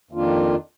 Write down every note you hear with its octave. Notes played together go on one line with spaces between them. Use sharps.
F2 D#3 A#3 D4 F4